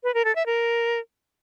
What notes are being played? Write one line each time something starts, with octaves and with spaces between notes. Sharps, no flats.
B4
A#4
A4
E5
A#4